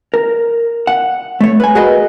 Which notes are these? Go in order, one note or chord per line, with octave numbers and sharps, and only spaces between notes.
A#4
F#5
A3 C#5
B4 G#5
F#4 G#4 A#4 B4 D#5